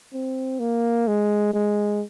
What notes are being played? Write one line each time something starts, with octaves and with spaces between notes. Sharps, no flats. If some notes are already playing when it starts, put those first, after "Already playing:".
C4
A#3
G#3
G#3